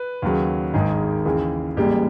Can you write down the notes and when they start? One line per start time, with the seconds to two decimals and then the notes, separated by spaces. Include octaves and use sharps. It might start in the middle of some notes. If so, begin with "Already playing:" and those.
Already playing: B4
0.22 D#2 C#3 F#3
0.74 G#1 G#2 D#3 G#4
1.25 D#2 C#3 E3
1.77 A1 G#2 E3 G3 A#3 G4